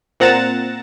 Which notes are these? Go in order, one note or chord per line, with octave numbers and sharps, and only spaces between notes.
A#2 C4 F#5 A#5 A6 E7